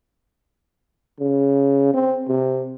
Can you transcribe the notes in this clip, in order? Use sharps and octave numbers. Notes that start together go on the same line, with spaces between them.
C#3
C4
C3